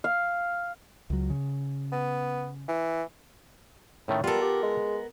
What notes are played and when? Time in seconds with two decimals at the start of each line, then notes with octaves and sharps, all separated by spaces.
0.04 F5
1.10 C#2 F#3
1.30 C#3
1.92 B3
2.68 E3
4.08 A2 D#3 A3 C#4
4.24 G3 B3 F4 A4 A#4
4.42 G4
4.63 G#3